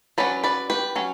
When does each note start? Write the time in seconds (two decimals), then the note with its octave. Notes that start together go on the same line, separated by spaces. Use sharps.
0.18 F#3 C#4 B4 D5
0.44 B4 D5
0.70 G4 B4
0.95 F#3 C#4